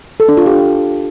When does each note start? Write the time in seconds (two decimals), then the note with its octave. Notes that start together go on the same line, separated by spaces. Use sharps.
0.20 A4
0.29 D4
0.37 F4
0.46 G4
0.55 D4